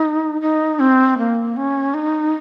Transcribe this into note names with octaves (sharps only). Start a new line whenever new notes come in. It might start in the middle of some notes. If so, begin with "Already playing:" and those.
Already playing: D#4
D#4
C4
A#3
C#4
D#4